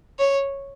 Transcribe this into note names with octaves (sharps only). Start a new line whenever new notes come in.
C#5